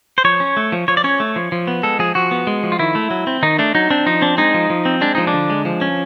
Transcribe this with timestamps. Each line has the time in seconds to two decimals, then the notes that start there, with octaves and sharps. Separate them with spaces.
0.18 C5
0.24 F3 C#5
0.40 C#4
0.57 A3
0.72 F3
0.88 F3 C#5
0.97 D5
1.04 C#4 C#5
1.20 A3
1.36 F3
1.52 F3
1.67 B3
1.83 G#3 A4
1.99 F3 G#4
2.15 F3 F#4
2.31 B3
2.47 G#3
2.63 F3
2.72 F4
2.79 D#3 E4
2.95 A3
3.11 F#3
3.27 C4
3.43 D#3 D#4
3.59 A3 D4
3.75 F#3 D#4
3.90 C4 D4
4.06 F3 D#4
4.22 C4 D4
4.38 G#3 D#4
4.54 F3
4.70 F3
4.85 C4
5.01 G#3 D4
5.15 F3 D#4
5.27 D4
5.33 D3
5.50 G#3
5.65 F3
5.81 C#4